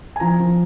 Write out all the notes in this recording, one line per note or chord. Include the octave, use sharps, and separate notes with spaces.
G#5
F3 A#5
F3